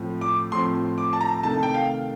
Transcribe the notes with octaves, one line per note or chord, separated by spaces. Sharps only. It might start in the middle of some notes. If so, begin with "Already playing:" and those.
Already playing: A2 F3 C4
D6
A2 F3 C4 C6
D6
A5
A#5
C3 D#3 A3 A5
G5
F5